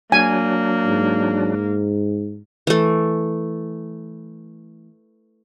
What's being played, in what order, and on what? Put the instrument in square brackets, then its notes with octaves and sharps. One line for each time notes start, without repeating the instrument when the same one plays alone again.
[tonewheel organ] F#3 D4 [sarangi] A#3 [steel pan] G#5
[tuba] G#2
[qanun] E3 A3